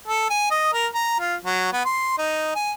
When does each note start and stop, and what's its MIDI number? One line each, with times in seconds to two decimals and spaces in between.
0.08 0.27 69
0.30 0.46 80
0.51 0.69 75
0.73 0.87 70
0.94 1.15 82
1.19 1.35 65
1.45 1.69 54
1.72 1.82 59
1.85 2.16 84
2.18 2.50 63
2.55 2.72 80